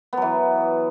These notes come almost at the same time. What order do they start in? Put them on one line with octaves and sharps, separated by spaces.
B3 F#3 E3